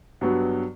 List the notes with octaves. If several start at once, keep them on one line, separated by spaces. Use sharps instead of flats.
G2 F#3 B3 F#4